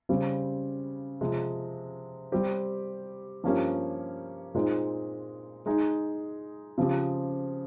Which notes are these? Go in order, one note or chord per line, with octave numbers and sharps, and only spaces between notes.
C#3 G3 C4
C3 F3 G#3
G3 C4 G4
G2 F3 A#3 C#4 G4
A#2 G#3 C4 D#4
G#3 D#4 G#4
C#3 F3 C4 G4